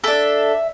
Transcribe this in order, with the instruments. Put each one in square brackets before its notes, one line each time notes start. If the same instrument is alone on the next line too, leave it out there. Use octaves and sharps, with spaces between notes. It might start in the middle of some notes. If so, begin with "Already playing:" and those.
[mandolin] D4 A4 E5